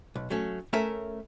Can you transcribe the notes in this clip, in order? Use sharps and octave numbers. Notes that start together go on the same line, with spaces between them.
B1
F#3 A3 C#4
A3 C#4 A4 A#4 C#5 E5